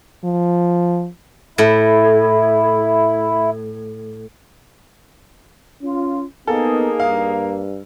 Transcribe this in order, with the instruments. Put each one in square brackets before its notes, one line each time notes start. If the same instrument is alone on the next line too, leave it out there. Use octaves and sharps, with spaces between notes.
[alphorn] F3
[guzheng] A2 [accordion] E4
[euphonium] C#4 [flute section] F4
[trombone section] A#3 [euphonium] B3 [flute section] D#4 G#4 [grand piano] A4
[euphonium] G2 [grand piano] F5